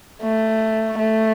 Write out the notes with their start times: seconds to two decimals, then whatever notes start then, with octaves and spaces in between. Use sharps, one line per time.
0.23 A3
0.98 A3